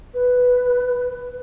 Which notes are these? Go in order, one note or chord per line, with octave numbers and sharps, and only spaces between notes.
B4